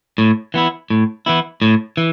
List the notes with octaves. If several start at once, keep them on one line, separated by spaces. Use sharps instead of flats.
A2
E3 B3 E4
A2
E3 B3 E4
A2
E3